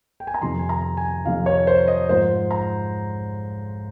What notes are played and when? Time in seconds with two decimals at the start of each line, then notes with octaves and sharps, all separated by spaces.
0.20 G5
0.27 G#5
0.34 A#5
0.41 F2 C3 D#3 C6
0.59 G#5
0.69 A#5
0.97 G#5
1.25 F2 C3 D#3 F5
1.46 C#5
1.67 C5
1.88 D#5
2.09 G#2 F3 C5
2.51 A#5